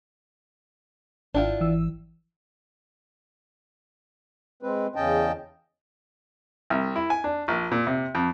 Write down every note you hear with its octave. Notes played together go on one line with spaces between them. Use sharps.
G#1 D4 E4 F4 G5
G#1 E3 E6
G#3 C4 B4
E2 C#3 C#4 D#5 G5 A5
C2
E4
G#5
D4
A#1
A#2
C3
F2